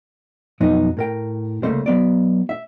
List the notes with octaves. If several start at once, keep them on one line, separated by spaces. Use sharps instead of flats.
F2 B2 F#3 B3 D#4
A2 A#4 G5
C2 C#3 A3 A#3 C#4 C5
F#3 B3 D5
E5